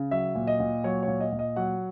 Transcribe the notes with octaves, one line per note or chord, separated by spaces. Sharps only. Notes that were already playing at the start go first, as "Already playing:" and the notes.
Already playing: C#3
F#3 E5
A#2
D#5
A#2
F#3 C#5
C#5
A#2
D#5
A#2
D#5
F#3 F#5